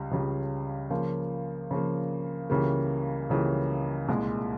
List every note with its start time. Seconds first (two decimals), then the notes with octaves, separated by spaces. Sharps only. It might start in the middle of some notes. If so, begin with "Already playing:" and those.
Already playing: C#2 C#3 G3
0.11 C#2 C#3 G3
0.90 C#3 F3 A#3
1.71 C#3 F3 A#3
2.50 C#2 C#3 E3 G3 A#3
3.30 C#2 C#3 E3 G3 A#3
4.08 C2 A#2 G#3